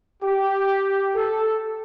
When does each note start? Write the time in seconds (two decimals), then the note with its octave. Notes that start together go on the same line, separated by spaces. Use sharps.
0.23 G4
1.15 A4